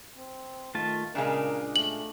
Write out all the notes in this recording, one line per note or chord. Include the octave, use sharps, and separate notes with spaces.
C4
D#3 A3 F4 A5
A#2 C#3 G#3 D4 A#4
A3 F#7